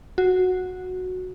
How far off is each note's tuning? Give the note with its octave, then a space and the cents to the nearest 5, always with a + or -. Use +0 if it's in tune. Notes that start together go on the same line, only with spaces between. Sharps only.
F#4 -10